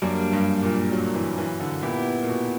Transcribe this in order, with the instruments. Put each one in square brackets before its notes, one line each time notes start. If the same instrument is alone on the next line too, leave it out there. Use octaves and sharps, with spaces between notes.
[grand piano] F#2 [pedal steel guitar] G3 A#3 D4
[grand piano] G2
A#2
F#3
E3
E3
D3
[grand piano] A#2 [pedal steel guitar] B3 E4 G4
[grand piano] A#2
B2